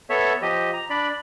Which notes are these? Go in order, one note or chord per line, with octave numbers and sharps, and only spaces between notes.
B3 A4 C#5 E5
F3 G4 D#5
A#5
D4 D5 B5